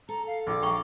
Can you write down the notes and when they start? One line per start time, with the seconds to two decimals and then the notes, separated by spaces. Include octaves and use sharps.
0.09 A4 A#5
0.26 F5
0.47 A#1 D6
0.62 F5 G5 A#5 C#6